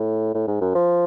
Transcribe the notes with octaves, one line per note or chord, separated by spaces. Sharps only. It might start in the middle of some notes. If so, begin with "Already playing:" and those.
Already playing: A2
A2
G#2
F#2
F3